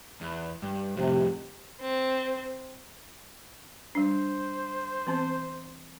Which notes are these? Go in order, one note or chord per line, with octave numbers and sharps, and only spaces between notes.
E2
G2
F2 A2 C3
C4
G3 D4 C5
E3 B3 C4